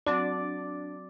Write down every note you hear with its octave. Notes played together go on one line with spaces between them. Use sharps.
F#3 C4 D4 F#4 D5